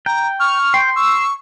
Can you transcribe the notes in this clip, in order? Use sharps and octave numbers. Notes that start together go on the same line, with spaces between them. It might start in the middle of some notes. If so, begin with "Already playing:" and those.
G5 A#5
C#6 F6
G5 C6
C#6 E6